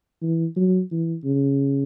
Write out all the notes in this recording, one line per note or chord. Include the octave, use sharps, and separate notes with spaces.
E3
F#3
E3
C#3